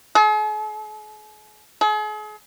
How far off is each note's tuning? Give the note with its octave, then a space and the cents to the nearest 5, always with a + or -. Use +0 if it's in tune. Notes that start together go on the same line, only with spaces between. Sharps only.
G#4 +45
G#4 +40